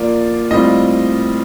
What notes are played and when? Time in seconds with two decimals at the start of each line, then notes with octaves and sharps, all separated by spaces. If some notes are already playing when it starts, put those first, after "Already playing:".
Already playing: F3 A#3 F4 D5
0.51 A2 G3 C4 F4 D#5